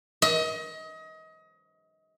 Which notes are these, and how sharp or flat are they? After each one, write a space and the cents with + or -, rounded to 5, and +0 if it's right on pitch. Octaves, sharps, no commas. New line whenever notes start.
D#5 +30